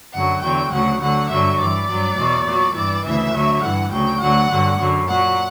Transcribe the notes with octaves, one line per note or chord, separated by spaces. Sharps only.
F#2 D3 F#3 F#5
E2 D3 F#3 G5
D2 C#3 F#3 F#5
D2 D3 F#3 F#5
G2 D3 F#3 E5
G2 E3 D5
G2 F#3
E2 B2 F#3
A#2 F#3
G2 E3 D5
D2 C#3 E3 E5
D2 D3 F#3
G2 E3 F#5
D2 C#3 F#3 G5
D2 D3 F#3 F#5
G2 D3 F#3
F#2 D3 F#3
A#2 F#3 F#5